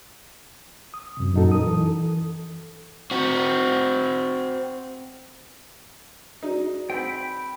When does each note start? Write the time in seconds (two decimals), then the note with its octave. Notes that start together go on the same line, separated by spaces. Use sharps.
0.94 D#6
1.17 F#2 C3
1.34 F#2 A#2 D#4 F#4 A4
1.51 A#4 D#6
1.64 E3 A4
3.11 C4 F#4
6.43 D#4 F#4 G#4 D5
6.90 C4 G5 B5